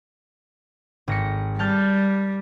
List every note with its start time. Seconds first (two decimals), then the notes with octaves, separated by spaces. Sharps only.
1.08 G#1 A#6 C#7
1.59 G3 A5 F6 G6